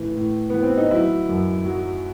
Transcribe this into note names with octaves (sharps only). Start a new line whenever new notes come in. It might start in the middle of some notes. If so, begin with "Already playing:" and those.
Already playing: A2 E3
A2
E3 B3
C4
D#4
F#3 E4
F#2
F#3